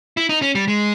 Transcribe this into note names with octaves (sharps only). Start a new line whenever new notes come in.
E4
D#4
C#4
G3
G#3